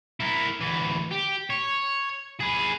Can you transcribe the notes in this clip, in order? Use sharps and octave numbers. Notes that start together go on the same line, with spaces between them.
E4 A#4
D2 E3
G4
C#5
G#4 B4